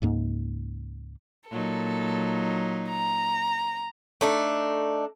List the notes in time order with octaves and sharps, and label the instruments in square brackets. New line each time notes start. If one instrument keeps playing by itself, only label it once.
[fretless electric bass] C#2 G#2 A#3
[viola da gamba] A#2 F#3 D#4 [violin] A4
[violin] A#5
[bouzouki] A3 D4 D#4